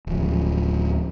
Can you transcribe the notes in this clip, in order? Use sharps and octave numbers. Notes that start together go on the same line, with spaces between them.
D1 F3